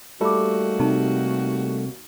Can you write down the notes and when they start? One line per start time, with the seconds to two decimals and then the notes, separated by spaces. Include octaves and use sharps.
0.21 D#2 G3 A3 F4 F#4 A4 D6
0.80 C3 D#4 A5